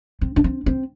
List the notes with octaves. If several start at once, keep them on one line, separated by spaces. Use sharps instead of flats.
C4
D4
C4
C4